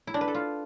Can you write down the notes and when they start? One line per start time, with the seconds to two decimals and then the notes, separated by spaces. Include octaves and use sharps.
0.07 E4
0.14 D4
0.21 B4
0.28 A4
0.35 F4